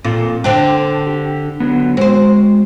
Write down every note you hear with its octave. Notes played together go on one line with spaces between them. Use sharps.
A#2 C4 F4 A4
D3 C4 D4 G5
G4
D3 F#3 B3
G#3 C4 F#4 C5